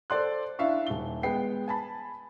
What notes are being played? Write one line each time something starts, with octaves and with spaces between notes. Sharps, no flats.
A4 C5 D5 C6 F#6
D4 E4 E5 F5 C#6
D#1 G7
G#3 B3 G5 C7
G#5 A5 B5